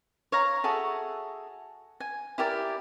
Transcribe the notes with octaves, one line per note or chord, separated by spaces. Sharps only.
C#5 F5 A#5
F#4 G#4 A4 E5
G#5
E4 G4 A#4 D5